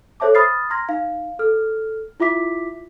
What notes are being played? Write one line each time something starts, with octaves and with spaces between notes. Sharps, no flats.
A4 C5 C#5 E5 A5 D6
B5 D#6 F6 A6 C7
A#5 C6 F6 G#6 A#6
D#4 F5
A4 F6
E4 F4 E5 D6 B6